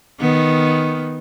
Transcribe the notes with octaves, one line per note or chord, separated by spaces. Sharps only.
D#3 B3